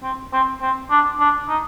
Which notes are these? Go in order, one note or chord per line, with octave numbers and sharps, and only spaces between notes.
C4
C4
C4
D4
D4
D#4